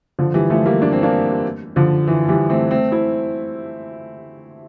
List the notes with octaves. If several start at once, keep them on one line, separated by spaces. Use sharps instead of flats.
D3 F3
E3 G3
F3 A3
G3 A#3
D4
C4
A#3 D4
D3 F3
E3
E3 G3
A3 C4
A3 C4
C4 E4